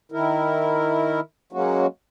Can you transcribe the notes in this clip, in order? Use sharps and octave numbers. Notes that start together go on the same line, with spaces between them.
D#3 E4 A#4
F#3 G#3 A#3 C#4 F#4